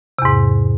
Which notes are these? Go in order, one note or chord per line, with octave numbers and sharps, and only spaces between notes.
E2 G#2 C3